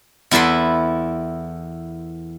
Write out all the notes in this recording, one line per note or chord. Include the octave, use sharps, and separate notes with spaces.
E2 E4 A4 B4 C6